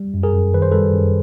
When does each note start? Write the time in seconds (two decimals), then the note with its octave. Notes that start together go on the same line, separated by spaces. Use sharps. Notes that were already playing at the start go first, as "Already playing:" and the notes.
Already playing: G3
0.14 F#2
0.23 G#4 A#4
0.33 F#2
0.54 D#3 B4
0.62 C5
0.71 G3 A4 B4
0.94 F#2